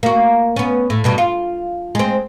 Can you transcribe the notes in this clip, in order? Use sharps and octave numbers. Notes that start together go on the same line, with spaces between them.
A#3 F#4
B3 C#4
A2
G2 B2 G3
F4
G#3 C4